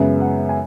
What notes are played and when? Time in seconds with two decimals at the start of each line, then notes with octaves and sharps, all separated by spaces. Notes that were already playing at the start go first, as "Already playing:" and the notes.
Already playing: F#2 C#3 G#3 B3 E5
0.20 F#5
0.49 G#5